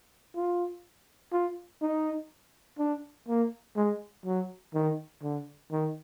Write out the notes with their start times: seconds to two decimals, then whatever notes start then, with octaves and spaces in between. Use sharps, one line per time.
0.35 F4
1.32 F4
1.82 D#4
2.79 D4
3.28 A#3
3.76 G#3
4.25 F#3
4.74 D#3
5.22 D3
5.71 D#3